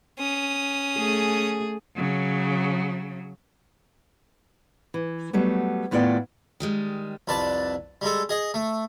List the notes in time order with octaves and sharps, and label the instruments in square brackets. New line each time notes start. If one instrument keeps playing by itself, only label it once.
[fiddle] C#4 D#6
[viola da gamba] A3 G#4
[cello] C#3 F#3
[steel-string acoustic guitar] E3
F#3 G3 A3 B3
D#2 A2 B3 F4 D5 G5
D#3 G3 G#3
[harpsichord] C2 F2 B4 D5 A5
G3 G#3 A4
G#4 D#5
A3